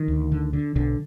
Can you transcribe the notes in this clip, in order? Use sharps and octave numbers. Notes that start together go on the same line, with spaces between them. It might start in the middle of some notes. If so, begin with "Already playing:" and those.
Already playing: D#3
D2
D3
D3
B1 D3